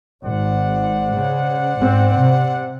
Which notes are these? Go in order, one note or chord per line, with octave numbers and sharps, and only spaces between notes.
G#1 C5 D5 F#5
C#3
G#2 C4
C3